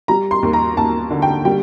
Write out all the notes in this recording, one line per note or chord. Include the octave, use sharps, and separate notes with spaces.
G3 A#5
C6
D#2
A#5
D#2 A5
D3
G5
G3 G5